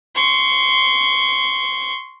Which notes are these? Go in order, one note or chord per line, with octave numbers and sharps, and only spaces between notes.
C6 C#6